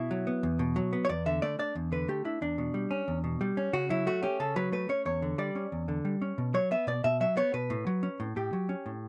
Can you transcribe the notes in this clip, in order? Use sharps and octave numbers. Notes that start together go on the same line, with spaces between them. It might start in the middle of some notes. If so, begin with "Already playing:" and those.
Already playing: B2 E4
F#3
B3
E2
B2
F#3
B3
C#5
E2 D5
D3 E5
A3 D5
D4 D5
E2
D3 B4
A3 G4
D4 E4
E2 D4
B2
G3
C#4
E2
B2
G3
C#4
C#3 F#4
F#3 E4
A3 F#4
C#4 G4
C#3 A4
F#3 B4
A3 B4
C#4 C#5
E2 C#5
D3
G3 D5
C#4
E2
D3
G3
C#4
B2
F#3 C#5
B3 E5
B2 D5
B2 E5
F#3 E5
B3 C#5
B2 B4
A2
F#3
C#4
A2
A2 G4
F#3
C#4
A2